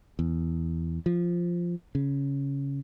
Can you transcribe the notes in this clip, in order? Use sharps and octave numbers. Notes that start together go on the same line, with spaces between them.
E2
F3
C#3